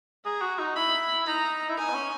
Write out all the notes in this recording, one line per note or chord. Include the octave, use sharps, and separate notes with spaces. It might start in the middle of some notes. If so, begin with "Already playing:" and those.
G#4 A#5
F#4
D#4
E4 B5
D#4 A#5
E4
D#4 G#5
B3
C#4